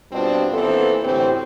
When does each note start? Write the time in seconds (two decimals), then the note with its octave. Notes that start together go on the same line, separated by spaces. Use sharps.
0.12 G2 B2 C4 D4 F4
0.53 A#2 E3 B3 C4 A4
1.03 D2 A2 E3 C4 G4